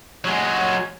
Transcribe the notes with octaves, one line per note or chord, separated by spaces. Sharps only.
F#3 G#3